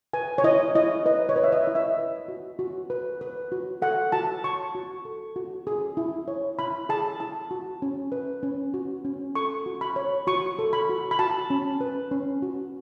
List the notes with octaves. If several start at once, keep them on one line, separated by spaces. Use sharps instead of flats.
B4 G#5
C#5
E4 D#5
E4 D#5
B4 D#5
C#5
B4
E5
D#5
E4
E5
B4
F#4
F#4
B4
B4
F#4
A4 F#5
F#4 A5
C#5 C#6
F#4
A4
F#4
G#4
E4
C#5
E4 B5
G#4 A5
E4 A5
F#4
C#4
B4
C#4
F#4
C#4
A4 C#6
F#4
B5
C#5
F#4 C#6
A4
B5
F#4
B5
F#4 A5
C#4
B4
C#4
F#4